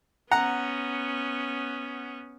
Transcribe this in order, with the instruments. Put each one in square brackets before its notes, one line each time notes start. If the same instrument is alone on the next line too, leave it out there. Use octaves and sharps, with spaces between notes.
[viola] B3 C#4 [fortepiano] F#5 A#5